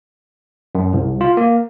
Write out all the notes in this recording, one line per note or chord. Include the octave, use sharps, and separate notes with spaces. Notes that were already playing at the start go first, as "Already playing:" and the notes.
F#2
C2
F4
A#3